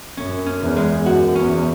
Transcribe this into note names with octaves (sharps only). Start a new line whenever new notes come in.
F#2 C#4
C#4
E2
G#3
F#2 F#4
E2 C#4